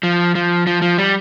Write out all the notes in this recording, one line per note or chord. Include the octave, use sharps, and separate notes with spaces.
F3
F3
F3
F3
G3